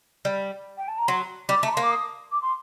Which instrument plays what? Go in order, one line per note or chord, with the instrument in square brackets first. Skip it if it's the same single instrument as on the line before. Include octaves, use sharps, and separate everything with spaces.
[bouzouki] G3
[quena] G5
A5
A#5
[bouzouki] F#3 [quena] C6
[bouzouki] G3 [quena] D6
[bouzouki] A3
[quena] A#5
C6
[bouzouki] A#3
[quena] D6
D#6
D6
C6